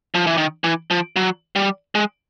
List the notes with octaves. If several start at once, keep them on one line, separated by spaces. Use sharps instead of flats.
F3
E3
D#3
E3
F3
F#3
G3
G#3